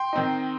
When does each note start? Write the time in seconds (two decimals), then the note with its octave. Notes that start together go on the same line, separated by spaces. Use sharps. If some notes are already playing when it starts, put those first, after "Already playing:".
Already playing: G5 C6
0.13 D#3 C4 D#4